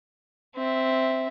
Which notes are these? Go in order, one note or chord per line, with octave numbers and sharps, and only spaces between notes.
C4 E5